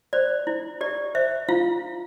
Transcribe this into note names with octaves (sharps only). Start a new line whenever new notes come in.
C5 D5
E4
G4 D5
C5 E5
E4 F4 F5